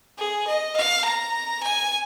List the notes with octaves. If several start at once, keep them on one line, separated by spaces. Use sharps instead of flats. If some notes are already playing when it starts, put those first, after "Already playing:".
G#4
D#5
F5
A#5
G#5